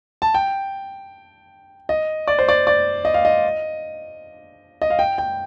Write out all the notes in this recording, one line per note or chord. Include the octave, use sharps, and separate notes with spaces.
A5
G5
D#5
D5
C5
D5
D5
D#5
F5
D#5
D#5
F5
G5
G5